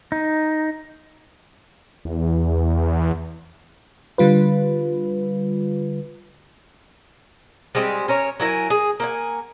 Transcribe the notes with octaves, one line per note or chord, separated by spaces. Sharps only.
D#4
E2
D3 G3 F4 B4
G3 G#3 C4 G4
C#4 A#4 C#5
F#3 E4 A#4 G#5
G#4
A#3 F#5 G#5